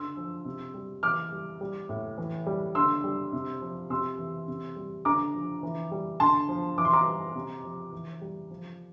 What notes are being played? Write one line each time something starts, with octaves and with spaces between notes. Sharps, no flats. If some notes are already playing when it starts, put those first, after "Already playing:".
Already playing: D3 C6 E6
F3
C3
G3
E3 D6 F6
G3
G3
A2
E3
G3
D3 C6 E6
G3
C3
F3
C3 C6 E6
E3
C3
G3
D3 A#5 D6
F3
E3
G3
D3 A5 C6
F3
E3 D6
C6
A#5 D6
G3
C3
F3
E3
G3
F3